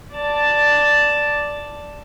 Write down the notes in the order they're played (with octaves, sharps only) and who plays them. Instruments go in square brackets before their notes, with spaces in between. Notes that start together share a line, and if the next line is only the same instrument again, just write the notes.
[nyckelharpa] D5 A5